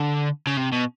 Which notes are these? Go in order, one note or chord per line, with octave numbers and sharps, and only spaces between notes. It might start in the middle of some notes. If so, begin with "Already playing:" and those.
Already playing: D3
C#3
C3
B2